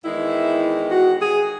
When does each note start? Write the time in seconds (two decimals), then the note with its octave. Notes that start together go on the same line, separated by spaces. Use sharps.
0.03 E2 D#3 G#3 E4
0.91 F#4
1.20 G#4